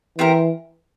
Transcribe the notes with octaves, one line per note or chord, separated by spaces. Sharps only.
E3 C4 G4 A#4